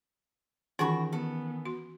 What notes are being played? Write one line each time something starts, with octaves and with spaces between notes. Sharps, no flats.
D#3 E3 C#4 F4 F#4 G#4 B5 C#6
B3 A4
F#4 C6